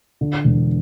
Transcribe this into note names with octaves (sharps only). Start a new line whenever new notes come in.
D3
E1